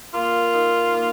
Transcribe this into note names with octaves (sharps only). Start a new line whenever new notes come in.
A#3 F4
D#4 A#4
A#3